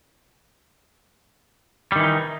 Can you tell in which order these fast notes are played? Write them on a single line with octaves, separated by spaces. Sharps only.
G3 D#3 E3 D#4